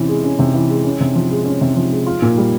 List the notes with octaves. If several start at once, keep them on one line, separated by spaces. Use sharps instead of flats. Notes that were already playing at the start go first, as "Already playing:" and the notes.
Already playing: C3 E3 C#4
G#3
C#4
C3
E3
G#3
C#4
C3
F3
G#3
C#4
C3
F3
G#3
F4
A#2
G3